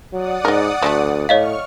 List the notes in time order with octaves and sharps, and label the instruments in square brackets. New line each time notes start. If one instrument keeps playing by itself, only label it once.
[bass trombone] F#3 [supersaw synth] D5 F#5 D#6
[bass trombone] G#2 [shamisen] D#4 A#4
[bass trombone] D2 [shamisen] F#3 G3 A3
[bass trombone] A2 [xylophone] C#5 D#5 F5 [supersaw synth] C#6 F6